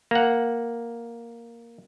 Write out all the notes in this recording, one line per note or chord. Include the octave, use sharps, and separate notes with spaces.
A#3 F#5